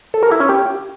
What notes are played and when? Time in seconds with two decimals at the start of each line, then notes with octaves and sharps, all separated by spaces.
0.14 A4
0.23 A#4
0.31 E4
0.40 C#4
0.49 G4